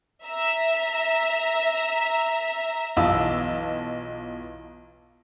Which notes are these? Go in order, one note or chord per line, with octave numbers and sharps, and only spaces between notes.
E5 A#5
B1 E3 F4 D#5 A5 E6